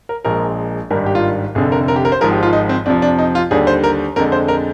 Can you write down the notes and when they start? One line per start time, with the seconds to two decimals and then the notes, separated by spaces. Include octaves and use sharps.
0.09 A#4
0.25 A#1 A#2 F3 G#3 A#4
0.90 G#1 G2 D#3 G3 A#4
1.06 G4
1.15 F4
1.55 F1 F2 D3 G#4
1.72 A#4
1.88 A#4
1.96 G4
2.05 A#4
2.12 C5
2.21 G#1 G#2 F3 A#4
2.32 G4
2.43 F4
2.53 D#4
2.69 C4
2.86 F2 C3 F3 D4
3.02 D4
3.18 D#4
3.35 F4
3.51 D#2 D3 G3 G#4
3.67 C5
3.84 A#4
4.16 F2 D3 G#3 A#4
4.32 C5
4.48 A#4